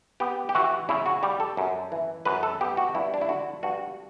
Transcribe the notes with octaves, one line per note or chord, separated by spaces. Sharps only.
B3 G4
G4
E3 F#4
C#3 E4
F#4
G3 G4
A4
F#2
E3
F#2 B4
A4
B3 G4
F#4
G2 E4
D4
E4
D3 F#4
G2 F#4